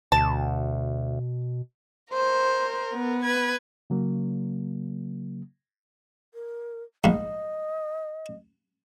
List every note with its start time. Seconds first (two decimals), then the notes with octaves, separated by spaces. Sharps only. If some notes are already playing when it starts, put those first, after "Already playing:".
0.12 D2 B2 A5
2.13 A#4 C5
2.93 B3
3.22 B4 G#6
3.90 C#3 F#3 A#3
6.34 A#4
7.04 A#1 G#2 D#5